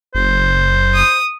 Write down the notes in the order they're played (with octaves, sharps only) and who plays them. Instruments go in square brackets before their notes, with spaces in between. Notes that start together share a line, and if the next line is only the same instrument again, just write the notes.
[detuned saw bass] F#1 [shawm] C5
[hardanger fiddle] D#6